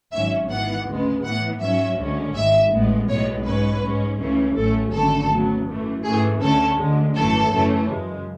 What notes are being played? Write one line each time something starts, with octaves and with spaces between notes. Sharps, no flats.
G#1 G#2 F#3 C#4 E5
G#2 E3 B3 F#5
D2 C#3 G#3 B3
A2 E3 B3 F#5
G#2 F#3 C#4 E5
D2 D3 G#3 C#4
G#1 G#2 G#3 E5
A1 A2 G#3 B3
B1 A2 G#3 B3 C#5
G#2 G#3 C#4 B4
G#2 G#3 C#4
C#2 C#3 E3 A3 C#4
A1 A2 F#3 A3 C#4 A4
G#1 F#2 D3 A3 A4
D2 C#3 F#3 B3
F#2 E3 A3
G#2 E3 A3 G#4
D2 D3 A3 C#4 A4
D2 D3 G#3
G#1 F#2 E3 A3 C#4 A4
F#2 C#3 E3 A3 C#4
F#2 C#3 G#3